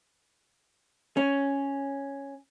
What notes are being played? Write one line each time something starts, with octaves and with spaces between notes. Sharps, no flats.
C#4